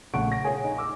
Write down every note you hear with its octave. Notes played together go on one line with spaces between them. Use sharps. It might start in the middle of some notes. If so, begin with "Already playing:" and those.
A#1 C#3 A3 F#5 C#6 D7
A#6
F4 G#4 C#5 G#5
D#4
D6 E6